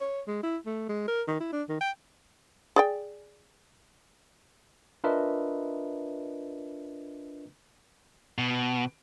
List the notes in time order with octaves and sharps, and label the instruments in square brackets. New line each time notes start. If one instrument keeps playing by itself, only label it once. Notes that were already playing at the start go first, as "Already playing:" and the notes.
[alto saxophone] C#5
G#3
E4
A3
G#3
A#4
D#3
E4
D4
D#3
G5
[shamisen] G#4 D5 G5
[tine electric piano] D4 F4 A#4 B4 D#5 E5
[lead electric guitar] B2